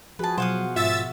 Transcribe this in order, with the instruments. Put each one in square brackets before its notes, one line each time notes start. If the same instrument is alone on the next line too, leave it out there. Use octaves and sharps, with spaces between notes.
[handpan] F3 F#4 G#4 [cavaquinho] B4 A5
[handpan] B2 F#5 [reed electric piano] F#3 [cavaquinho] C5 F5 D#6
[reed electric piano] G#2 F4 [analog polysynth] E5 E6 A6